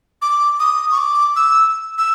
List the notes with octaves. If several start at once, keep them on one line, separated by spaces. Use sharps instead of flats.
D6
D#6
C#6
D6
E6
E6